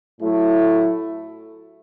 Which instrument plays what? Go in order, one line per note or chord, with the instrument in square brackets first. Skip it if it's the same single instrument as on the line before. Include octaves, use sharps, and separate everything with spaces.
[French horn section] A2 F#3 A3 E4